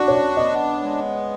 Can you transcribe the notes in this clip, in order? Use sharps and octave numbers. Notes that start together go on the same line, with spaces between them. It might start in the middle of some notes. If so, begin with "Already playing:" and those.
Already playing: D4 F#4 D5
C#5
D5
B3 D#5
G#3